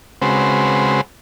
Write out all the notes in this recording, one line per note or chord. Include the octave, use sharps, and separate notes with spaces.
C#3 G#3 C4 F#4 B4 C5